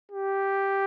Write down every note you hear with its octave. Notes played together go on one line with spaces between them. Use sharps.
G4